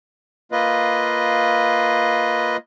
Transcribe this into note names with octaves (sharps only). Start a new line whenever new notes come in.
A#3 F4 B4 D#5